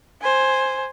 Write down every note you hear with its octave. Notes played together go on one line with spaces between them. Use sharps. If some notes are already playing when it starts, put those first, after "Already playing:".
C5 G#5